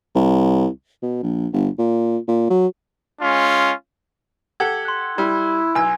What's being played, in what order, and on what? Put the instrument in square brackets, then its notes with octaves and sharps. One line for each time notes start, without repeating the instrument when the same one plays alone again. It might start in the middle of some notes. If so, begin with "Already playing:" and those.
[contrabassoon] C2
B2
A#1
G1
A#2
A#2
F#3
[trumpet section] G#3 C#4 F4
[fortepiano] G4 A4 F#5 [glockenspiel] G#6 G7
[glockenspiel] C6 F#6
[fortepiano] G3 [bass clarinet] E4
[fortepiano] B1 E6 [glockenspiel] G#5 G#6